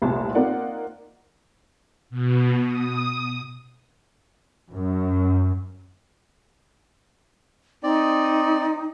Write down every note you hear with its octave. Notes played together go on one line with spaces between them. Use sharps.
F1 C2 A#2 A5
A#3 C4 D#4 F4 D5 F#5
B2
D#6
F#2
C4 D#4 D5